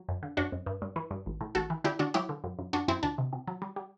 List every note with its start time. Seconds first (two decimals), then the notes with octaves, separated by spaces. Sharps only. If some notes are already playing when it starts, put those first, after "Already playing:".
Already playing: F#3
0.09 F#2
0.23 D3
0.37 F#2 D4 F#4
0.52 F#2
0.66 G2
0.82 G2
0.96 E3
1.11 G2
1.26 A1
1.41 A2
1.55 A1 F#4 A4
1.70 E3
1.84 D3 E4 G4
1.99 D3 D4 F#4
2.14 F#3 E4 G4
2.29 D3
2.44 F#2
2.59 F#2
2.73 F#2 D4 F#4
2.88 F#2 C4 E4
3.03 D2 D4
3.18 C3
3.33 C3
3.47 F#3
3.62 G3
3.76 G3